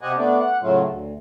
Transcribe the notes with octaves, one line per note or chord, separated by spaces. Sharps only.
C3 G4 C5 D#5 F#5 G#5
A3 B3 D4 D5
F#5
A2 C#3 F#3 A3 F4
D2